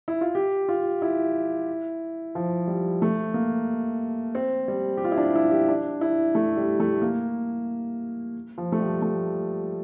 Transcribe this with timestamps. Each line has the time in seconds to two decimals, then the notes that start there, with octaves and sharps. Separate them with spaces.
0.08 E4
0.21 F4
0.35 G4
0.68 F4
1.02 E4
2.35 F3
2.67 G3
3.02 A3
3.34 A#3
4.35 C4
4.68 G3
4.97 G4
5.04 F4
5.12 E4
5.18 D4
5.35 E4
5.51 G4
5.68 D4
6.01 E4
6.35 A3
6.57 G3
6.80 A3
7.02 A#3
8.58 F3
8.72 A3
8.80 G3
9.02 A3